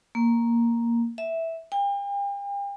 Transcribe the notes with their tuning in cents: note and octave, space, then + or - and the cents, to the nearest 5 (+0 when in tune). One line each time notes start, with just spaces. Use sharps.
A#3 +0
E5 -5
G5 +40